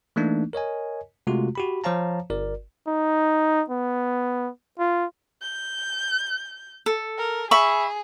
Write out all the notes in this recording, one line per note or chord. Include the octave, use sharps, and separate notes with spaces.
E3 A3 A#3 D4 D#4
A#4 C#5 D#5 G#5
C3 G#3 A3 F4 F#4
F#4 G4 B5
F3 C5 C#5 F5 A5 A#5
G1 A#4 D5
D#4
B3
F4
G6
A4
A#4
G#4 E5 B5 C#6